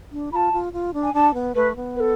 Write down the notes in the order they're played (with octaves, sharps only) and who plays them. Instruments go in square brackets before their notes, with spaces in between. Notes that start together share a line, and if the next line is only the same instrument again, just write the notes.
[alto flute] D4
[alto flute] F4 [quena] A5 B5
[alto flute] F4
F4
D4
[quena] G#5
[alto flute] D4 [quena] A5
[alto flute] B3
[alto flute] A3 [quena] B4
[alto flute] B3
[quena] B4
A4